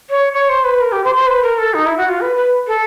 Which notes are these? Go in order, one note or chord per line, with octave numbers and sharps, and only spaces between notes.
C#5
C#5
C5
B4
A#4
G4
C5
C5
B4
A#4
A4
D#4
E4
F#4
F4
B4
B4
A4